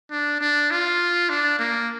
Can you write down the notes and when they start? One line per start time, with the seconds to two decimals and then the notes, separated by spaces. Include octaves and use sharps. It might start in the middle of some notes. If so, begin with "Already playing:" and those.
0.11 D4
0.41 D4
0.71 F4
1.29 D4
1.59 A#3